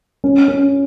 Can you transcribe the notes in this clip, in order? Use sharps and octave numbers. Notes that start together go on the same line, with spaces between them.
C#4
C#4